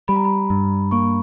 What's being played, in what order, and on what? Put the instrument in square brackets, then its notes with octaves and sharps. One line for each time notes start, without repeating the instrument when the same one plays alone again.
[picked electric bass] G3 [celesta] B5
[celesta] A#5
B5
[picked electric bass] G2
[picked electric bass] A#3 [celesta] C#6